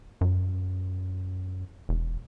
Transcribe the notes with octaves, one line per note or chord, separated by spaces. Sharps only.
F#2
E1